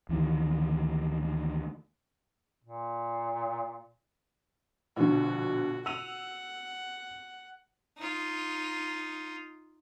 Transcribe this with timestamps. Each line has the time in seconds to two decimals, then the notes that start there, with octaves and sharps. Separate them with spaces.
0.09 D2 D#3 E3
2.64 A#2
4.96 A#1 B2 D3 F#4
5.86 F#5 E6 D#7 F7
7.97 D#4 F4